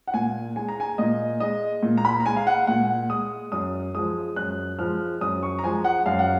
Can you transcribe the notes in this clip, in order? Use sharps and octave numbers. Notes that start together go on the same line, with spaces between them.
F#5
A#2 G#5
G#3 G#5
A#5
G#5
A#2 D#5
G#3 D#5
A#2
A#5
B5
A#5
G#3 G#5
F5
F#5
A#2 F#5
G#3 D#6
F#2 D#6
F3 G#3 D#6
F#2 F#6
F3 G#3 F6
F#2 D#6
C#6
A#5
F3 G#3 G#5
F#5
F#2 F5
F#5